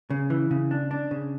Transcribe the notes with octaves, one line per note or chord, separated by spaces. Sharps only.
C#3
E3
C#3
D4
D4
C#3